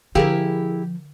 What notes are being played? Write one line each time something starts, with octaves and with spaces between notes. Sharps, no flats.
D3 F3 E4 G4 G#4 A#4 F5